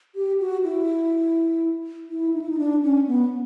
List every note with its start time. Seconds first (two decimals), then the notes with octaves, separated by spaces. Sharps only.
0.15 G4
0.40 F#4
0.64 E4
2.10 E4
2.34 D#4
2.42 E4
2.49 D#4
2.59 D4
2.83 C#4
3.07 B3